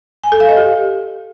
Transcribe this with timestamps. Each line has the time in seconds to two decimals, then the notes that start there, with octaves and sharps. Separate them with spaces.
0.24 G#5
0.32 A4
0.40 F5
0.49 D#5
0.57 G4